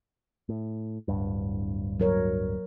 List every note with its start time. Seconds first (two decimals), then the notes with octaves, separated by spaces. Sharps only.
0.49 A2
1.08 D1 G2
2.00 F#3 A#4 C#5